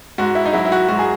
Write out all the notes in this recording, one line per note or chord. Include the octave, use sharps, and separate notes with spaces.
G#2 F#4
E4
D#4
F#3 E4
E4
F#4
G#2 F#4
G#4